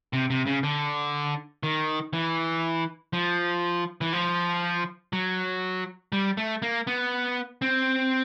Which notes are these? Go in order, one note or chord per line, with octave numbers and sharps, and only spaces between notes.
C3
C3
C#3
D3
D#3
E3
F3
E3
F3
F#3
G3
A3
A#3
B3
C4